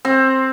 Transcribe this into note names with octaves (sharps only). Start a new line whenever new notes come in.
C4